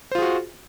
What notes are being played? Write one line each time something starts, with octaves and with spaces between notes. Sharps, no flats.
F4 F#4 G#4 C5